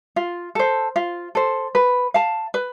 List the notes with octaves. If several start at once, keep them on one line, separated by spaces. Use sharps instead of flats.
F4
A4 C5
F4
A4 C5
B4
F5 A5
B4